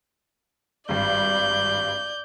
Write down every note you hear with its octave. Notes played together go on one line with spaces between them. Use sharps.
G#1 G2 D5 G6